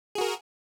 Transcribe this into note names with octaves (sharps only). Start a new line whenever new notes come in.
F#4 G#4 A#4